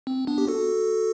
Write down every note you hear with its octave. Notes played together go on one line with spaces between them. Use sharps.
C4
B3 D4
G4
F#4 A4